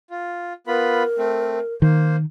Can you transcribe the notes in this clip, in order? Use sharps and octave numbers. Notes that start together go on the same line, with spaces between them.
F4
B3 F4 A#4 B5
A3 C4
D#3 A#3 C5